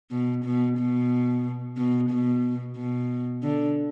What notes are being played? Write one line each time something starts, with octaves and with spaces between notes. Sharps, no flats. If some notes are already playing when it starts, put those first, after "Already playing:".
B2
B2
B2
B2
B2
B2
D3